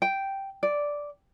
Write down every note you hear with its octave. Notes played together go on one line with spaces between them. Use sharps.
G5
D5